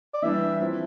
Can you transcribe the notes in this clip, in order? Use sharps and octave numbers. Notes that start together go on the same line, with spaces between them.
D5
E3 G3 D4 E5
F3 C4 E4